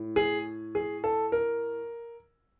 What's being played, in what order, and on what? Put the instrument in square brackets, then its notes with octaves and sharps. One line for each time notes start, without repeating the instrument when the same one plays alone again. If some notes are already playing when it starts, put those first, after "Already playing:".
Already playing: [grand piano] A2
G#4
G#4
A4
A#4